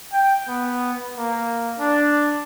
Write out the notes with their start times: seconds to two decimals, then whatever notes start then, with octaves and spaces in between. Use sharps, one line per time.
0.13 G5
0.48 B3
1.18 A#3
1.79 D4